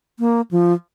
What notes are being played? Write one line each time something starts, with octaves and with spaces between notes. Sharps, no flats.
A#3
F3